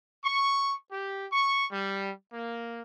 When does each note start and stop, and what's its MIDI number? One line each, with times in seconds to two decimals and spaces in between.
0.24 0.75 85
0.91 1.26 67
1.32 1.66 85
1.72 2.11 55
2.34 2.82 58